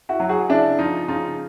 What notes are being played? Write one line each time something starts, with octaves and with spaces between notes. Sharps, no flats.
E4 F#4
F#3
F#4 G#4
C#3 D4 E4
F3 D#4 F4
C#3 D#4 F4